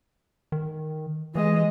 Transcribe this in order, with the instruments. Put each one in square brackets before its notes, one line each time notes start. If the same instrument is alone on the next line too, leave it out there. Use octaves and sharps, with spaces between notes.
[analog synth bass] D#3
[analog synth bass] E3 [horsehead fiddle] G#3 D#5